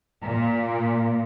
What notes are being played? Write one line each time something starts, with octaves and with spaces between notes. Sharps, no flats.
A#2